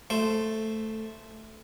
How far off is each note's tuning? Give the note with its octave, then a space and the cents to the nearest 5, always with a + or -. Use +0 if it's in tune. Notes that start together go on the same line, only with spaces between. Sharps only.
A3 +0 C5 +0